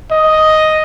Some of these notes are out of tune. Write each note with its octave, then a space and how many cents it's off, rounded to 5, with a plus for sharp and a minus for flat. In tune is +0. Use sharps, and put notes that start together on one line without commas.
D#5 +5